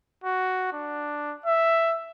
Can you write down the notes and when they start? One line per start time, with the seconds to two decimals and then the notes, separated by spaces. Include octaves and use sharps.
0.24 F#4
0.73 D4
1.46 E5